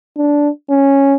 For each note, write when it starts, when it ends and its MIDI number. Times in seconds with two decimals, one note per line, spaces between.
0.17 0.49 62
0.70 1.15 61